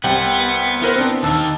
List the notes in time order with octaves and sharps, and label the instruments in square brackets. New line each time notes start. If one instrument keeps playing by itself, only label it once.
[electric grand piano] C2 C3 G5 [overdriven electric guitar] B3 F#5
[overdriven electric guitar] B3 [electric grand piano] E4 A#4 C5
[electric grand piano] C4 D4
[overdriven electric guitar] D#2 D#3 [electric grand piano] A5 E6